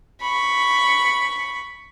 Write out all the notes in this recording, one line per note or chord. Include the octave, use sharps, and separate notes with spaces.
B5 C#6